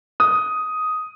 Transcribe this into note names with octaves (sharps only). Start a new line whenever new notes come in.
D#6